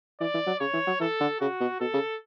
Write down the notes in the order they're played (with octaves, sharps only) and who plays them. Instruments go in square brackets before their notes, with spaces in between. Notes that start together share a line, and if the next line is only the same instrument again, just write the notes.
[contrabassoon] E3 [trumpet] D5
[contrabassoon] E3
F#3
[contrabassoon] C#3 [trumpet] C#5
[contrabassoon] E3
F#3
[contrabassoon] E3 [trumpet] A4
[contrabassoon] D3
[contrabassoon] C#3 [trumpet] F#4
[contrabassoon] B2
[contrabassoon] B2 [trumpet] A4
[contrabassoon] C#3